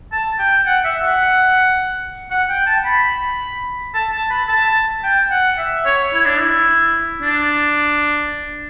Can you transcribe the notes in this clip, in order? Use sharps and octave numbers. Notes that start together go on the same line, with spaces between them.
A5
G5
F#5
E5
F#5
F#5
G5
A5
B5
A5
A5
B5
A5
G5
F#5
E5
C#5
E4
D4
E4
D4